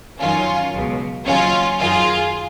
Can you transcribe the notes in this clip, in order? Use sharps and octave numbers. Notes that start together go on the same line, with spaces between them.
F#2 D#3 F#3 C#4 F4
C#2 B2 F#3
D#2 C#3 F#3 C#4 F4
F#2 D#3 F#3 F4 G#4